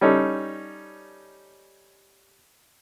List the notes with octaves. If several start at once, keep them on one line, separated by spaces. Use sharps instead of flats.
G3 C#4 D#4 A4